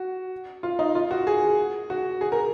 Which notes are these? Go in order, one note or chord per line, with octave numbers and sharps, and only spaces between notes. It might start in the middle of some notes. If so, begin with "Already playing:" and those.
Already playing: F#4
F4
D#4
F4
F#4
G#4
F#4
G#4
A#4